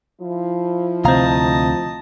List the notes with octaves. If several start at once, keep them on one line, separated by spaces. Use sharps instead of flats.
F3 E4
D2 C3 C4 D#5 F5 A5 A#5